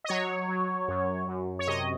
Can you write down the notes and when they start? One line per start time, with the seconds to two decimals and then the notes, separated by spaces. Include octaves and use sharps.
0.04 D#5
0.09 F#3 C#5
0.48 F#3
0.88 F#2
1.27 F#2
1.59 C#5
1.67 C3 D#5